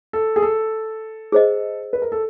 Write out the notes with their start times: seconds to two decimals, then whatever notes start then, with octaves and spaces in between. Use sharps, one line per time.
0.13 A4
0.36 G#4
0.42 A4
1.32 G#4 C5 D#5
1.93 B4
2.02 A#4
2.12 A4